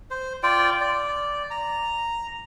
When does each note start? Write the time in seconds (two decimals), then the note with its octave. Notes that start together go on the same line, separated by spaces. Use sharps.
0.11 C5
0.43 F4 D5 G5
0.81 D5
1.51 A#5